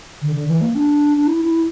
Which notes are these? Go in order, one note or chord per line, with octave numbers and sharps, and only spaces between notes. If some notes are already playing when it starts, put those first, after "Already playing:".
D3
D3
E3
A#3
D4
D4
E4
E4